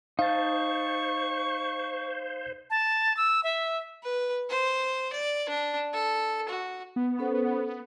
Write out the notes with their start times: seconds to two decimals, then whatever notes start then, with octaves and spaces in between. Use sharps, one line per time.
0.19 D#4 C5 F5 A5 C#6
2.70 A5
3.17 E6
3.44 E5
4.03 B4
4.50 C5
5.13 D5
5.49 D4
5.94 A4
6.49 F#4
6.96 B3
7.19 C#4 A4 C5